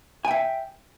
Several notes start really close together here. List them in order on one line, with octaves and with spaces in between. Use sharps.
G#5 G5 E5